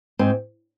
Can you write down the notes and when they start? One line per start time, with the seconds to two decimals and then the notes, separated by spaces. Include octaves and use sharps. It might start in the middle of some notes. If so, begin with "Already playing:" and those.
0.19 G#2 C4